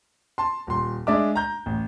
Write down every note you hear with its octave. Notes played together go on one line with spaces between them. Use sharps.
A5 C6
D#1 C6
G#3 D4 D5 E5 D6
A#5 G6
A1